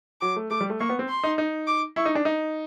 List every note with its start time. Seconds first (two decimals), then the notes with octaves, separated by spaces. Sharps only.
0.21 F#3 D6
0.36 A3
0.51 A3 D6
0.61 G3
0.70 A3
0.80 A#3 C#6
0.89 B3
0.99 C4
1.09 C6
1.23 D#4
1.38 D#4
1.67 D6
1.96 E4 C#6
2.06 D#4
2.15 D4
2.25 D#4